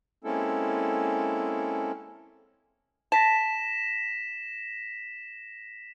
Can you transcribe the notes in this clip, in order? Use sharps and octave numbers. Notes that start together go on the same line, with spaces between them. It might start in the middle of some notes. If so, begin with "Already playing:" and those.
G#3 A#3 C4 C#4 E4 A4
A5 A#6 B6 E7